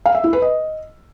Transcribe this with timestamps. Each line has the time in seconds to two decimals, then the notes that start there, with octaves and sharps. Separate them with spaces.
0.06 F5
0.15 E5
0.24 E4
0.33 B4
0.42 D#5